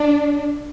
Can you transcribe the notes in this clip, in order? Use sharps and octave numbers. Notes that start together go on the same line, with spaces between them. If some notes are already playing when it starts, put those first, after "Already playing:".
Already playing: D4